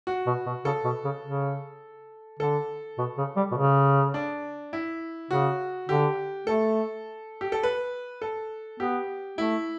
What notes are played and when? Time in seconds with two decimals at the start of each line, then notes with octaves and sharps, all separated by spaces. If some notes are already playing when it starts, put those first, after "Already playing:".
0.07 F#4
0.26 B2
0.46 B2
0.65 C#3 A4
0.84 B2
1.04 C#3
1.23 C#3
2.39 D3 A4
2.98 B2
3.18 C#3
3.36 G3
3.52 B2
3.56 C#3
4.14 D4
4.73 E4
5.31 C#3 F#4
5.89 D3 G4
6.47 A3 A4
7.41 G4
7.52 A4
7.63 B4
8.22 A4
8.80 B3 G4
9.38 A3 E4